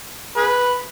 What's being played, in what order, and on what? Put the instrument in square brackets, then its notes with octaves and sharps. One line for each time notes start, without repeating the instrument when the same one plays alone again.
[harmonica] G#4 B4